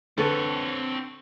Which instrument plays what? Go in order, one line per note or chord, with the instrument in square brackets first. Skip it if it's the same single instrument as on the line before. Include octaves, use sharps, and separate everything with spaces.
[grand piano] D3 [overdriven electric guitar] C4 C#5 [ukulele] A4 B4